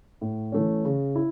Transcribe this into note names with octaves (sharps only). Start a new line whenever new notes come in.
A2
E3 A3 C#4
C#3
E4